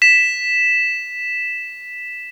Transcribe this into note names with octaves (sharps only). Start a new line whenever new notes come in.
B6 E7